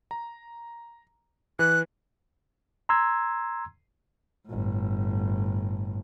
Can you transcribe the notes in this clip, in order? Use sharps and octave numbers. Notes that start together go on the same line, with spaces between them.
A#5
E3 B4 F#6
A#5 C6 E6 G#6
G1 A2